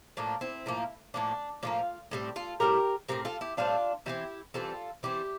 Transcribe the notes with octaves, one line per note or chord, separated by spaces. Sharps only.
A2 F3 A#3 D4
C4 E4
A2 F3 A#3
A2 F3 A#3 D4
A2 F3 A#3 D4 F4
A2 G3 C4
F4 A4
A2 G3 C4 G4 A#4
A2 G3 C4 G4 A#4
F4 A4
E4 G4
A2 G3 C4 D4 F4
E3 G3 C4 E4 G4
E3 G3 C4 F4 A4
E3 G3 C4 E4 G4